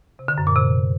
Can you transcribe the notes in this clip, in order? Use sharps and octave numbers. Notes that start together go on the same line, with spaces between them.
C3
D3
F#2
A#2
C3